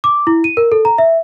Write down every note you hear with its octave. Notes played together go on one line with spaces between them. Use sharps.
D6
E4
D#7
A#4
A4
A#5
E5